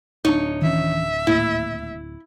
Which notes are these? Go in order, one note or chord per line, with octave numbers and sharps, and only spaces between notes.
D1 D4 D#4 C#5
D#3 E3 C#4 E5
D#1 A2 A#3 E4